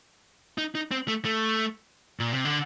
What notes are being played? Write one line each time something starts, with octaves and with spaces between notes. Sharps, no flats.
D#4
D#4
C4
A3
A3
A#2
C3
D3